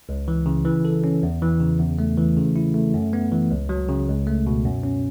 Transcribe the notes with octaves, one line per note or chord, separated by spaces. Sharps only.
C#2
E3
C#3
E3
A4
C#4
E2
E3
C#3
E2
A3
E3
C#3
E4
A3
F#2
B3
E3
C#2
F#3
C#3
C#2
A3
B2
F#2
C#4